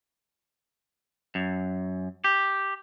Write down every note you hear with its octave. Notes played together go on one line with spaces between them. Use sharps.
F#2
G4